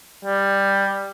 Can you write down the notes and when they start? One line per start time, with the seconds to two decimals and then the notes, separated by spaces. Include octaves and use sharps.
0.25 G3